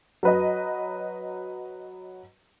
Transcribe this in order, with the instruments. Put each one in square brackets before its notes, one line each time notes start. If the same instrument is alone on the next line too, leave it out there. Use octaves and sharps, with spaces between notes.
[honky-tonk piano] F#3 B4 D#5